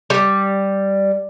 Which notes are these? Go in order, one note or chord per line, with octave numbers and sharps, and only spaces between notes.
G3